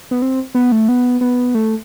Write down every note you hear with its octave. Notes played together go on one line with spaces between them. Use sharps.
B3
C4
B3
A3
B3
B3
A3